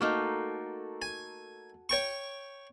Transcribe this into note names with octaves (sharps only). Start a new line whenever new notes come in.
A3 A#3 D#4 F#4 A4
G#5
C#5 G5 C#6